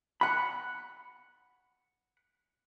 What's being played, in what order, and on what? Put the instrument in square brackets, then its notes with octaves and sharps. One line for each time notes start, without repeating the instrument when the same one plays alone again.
[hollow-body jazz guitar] F#5 B5